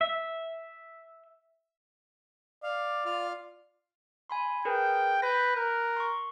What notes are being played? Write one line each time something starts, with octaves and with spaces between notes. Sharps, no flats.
E5
D5 F5
F4 F5 F6
G#5 B5 C6
G#4 A#4 B4 G5
B4 G6 A#6
A#4 F#6
C6 C#6